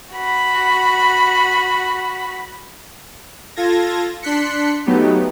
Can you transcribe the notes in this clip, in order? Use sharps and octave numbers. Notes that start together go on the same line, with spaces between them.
F#4 B5
F4 A4 G#6 A#6
D4 C6 F#6 B6 C#7
F#3 A3 B3 D#4 G4